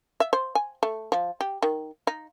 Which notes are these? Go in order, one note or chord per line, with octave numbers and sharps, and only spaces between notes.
E5
C5
G#5
A3
F3
G4
D#3
D#4